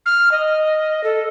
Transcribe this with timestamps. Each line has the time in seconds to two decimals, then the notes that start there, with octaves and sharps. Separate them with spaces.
0.06 F6
0.32 D#5
1.04 A4